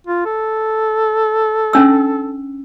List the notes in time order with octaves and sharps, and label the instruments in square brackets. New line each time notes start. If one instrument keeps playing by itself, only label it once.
[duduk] F4
A4
[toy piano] C#4 D4 E6